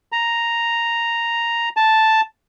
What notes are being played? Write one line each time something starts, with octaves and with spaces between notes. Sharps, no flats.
A#5
A5